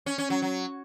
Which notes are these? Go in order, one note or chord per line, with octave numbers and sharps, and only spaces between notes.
C#4
C#4
F#3
F#3